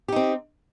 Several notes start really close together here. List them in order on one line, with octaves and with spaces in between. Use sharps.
G4 D#4 C4